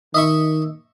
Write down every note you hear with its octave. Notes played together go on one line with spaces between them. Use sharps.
D#3 D#5 E5 C#6